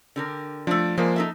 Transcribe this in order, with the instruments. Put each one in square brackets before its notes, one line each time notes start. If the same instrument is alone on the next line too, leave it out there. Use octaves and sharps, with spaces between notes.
[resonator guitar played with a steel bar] D3 G4 A#4
[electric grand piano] F3 [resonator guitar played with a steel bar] A3 D4
[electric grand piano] F3 A#3 [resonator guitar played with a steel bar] G#3 C5
[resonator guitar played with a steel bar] D#4 A4 E5